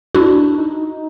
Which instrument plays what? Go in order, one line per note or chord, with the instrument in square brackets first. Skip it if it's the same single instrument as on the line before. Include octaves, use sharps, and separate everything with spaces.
[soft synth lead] D4 [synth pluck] E4 F#4
[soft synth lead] D#4